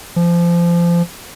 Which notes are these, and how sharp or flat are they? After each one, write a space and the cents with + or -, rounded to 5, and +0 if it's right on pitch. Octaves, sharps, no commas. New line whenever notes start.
F3 -25